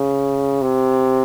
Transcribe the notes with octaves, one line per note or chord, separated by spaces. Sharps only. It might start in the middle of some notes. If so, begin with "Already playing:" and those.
Already playing: C#3
C3